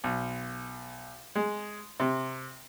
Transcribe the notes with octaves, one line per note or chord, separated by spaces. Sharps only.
B1
G#3
C3